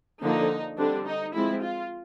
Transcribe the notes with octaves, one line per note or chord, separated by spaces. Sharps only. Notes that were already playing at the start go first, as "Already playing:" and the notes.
D3 F3 A#3 D4 D#4
D3 G3 C4 D4
D#4
F3 G#3 C4 E4
F4